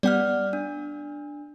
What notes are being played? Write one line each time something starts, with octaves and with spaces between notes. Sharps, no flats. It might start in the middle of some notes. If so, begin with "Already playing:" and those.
G3 B3 D5 F#5 F6
D4